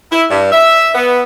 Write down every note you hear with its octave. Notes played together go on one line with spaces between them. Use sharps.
E4
G2
E5
B3